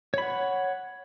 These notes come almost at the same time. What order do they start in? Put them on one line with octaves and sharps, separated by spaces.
C#5 B5 F#5